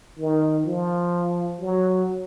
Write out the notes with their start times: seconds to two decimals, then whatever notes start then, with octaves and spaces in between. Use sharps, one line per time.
0.19 D#3
0.66 F3
1.61 F#3